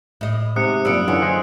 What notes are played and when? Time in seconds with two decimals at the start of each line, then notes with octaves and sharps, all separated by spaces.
0.21 A2 D#5
0.56 G#2 C3 D#6 F#6 C#7
0.85 F#2 A#2 G3 F5 E6 C#7 D7
1.08 F#2 D3 E3 F#3 C#4
1.22 G#4 C5 D#5